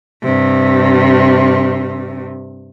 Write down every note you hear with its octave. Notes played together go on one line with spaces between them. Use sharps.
G2 C3